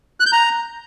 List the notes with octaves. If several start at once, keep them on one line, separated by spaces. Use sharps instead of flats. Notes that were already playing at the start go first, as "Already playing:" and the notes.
F#6
G6
A#5